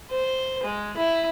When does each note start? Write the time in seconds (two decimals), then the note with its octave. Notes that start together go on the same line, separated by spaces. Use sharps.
0.10 C5
0.64 G#3
0.97 E4